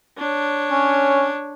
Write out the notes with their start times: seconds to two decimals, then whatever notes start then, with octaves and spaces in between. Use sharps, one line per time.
0.18 D4 C#5
0.71 C#4